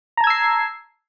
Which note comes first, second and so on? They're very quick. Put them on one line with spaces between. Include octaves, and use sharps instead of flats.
A#5 A5 G#6 E6 C7